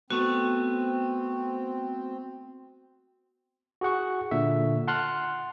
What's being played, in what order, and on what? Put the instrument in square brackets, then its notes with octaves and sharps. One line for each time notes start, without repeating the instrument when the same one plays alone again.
[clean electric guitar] A3 B3 [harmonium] C4 [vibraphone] F#4
[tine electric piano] F#4 G#4 F#5 C#6
A#2 D3 E5
F#5 A5 C6 F6 F#6